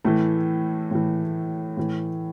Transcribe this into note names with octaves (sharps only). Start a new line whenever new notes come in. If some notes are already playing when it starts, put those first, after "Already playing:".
A2 E3 A3
A2 E3
A2 E3